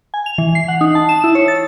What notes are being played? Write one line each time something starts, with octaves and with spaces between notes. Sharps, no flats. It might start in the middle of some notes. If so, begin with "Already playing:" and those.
G#5
F7
E3
C7
F#5
D#4
A5
E7
E4
C#5
A6